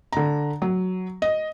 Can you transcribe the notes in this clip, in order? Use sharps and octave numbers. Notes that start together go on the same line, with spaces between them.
D3 A#5
F#3
D#5